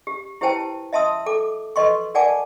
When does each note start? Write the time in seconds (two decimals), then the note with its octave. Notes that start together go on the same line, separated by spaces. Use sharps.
0.07 G4
0.41 E4 G4 B4 C5 G5 A5
0.93 D#5 E5 A5 C6 D#6 E6
1.26 A4 D6
1.76 F#4 A4 B4 D#5 C6 C#6
2.15 A#4 D5 F#5 G#5 A5 D6